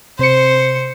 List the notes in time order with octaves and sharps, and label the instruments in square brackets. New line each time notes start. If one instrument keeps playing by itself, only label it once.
[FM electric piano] C3 C#7 [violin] C5